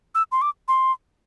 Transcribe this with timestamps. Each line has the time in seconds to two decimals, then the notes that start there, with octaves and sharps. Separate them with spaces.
0.15 E6
0.32 C6
0.42 D6
0.68 C6